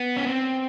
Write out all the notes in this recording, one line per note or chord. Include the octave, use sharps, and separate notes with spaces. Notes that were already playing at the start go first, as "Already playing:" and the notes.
Already playing: B3
C#4
C4